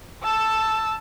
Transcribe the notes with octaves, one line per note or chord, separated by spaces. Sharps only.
A5 E6